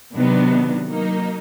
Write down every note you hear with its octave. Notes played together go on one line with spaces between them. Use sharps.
C3 D#3 F#3 B3 D4
F#3 A#3 D#4